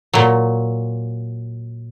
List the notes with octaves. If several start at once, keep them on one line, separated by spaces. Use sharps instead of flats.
A#2 F#3